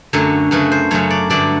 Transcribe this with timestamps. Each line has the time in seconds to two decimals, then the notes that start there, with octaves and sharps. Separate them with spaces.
0.13 F#2 D3 F#3 A3 C#5
0.51 F#2 C#3 F#3 A3 B4
0.72 C5
0.91 F#2 C#3 F#3 A3 C#5
1.10 D5
1.30 G2 D3 F#3 A3 D5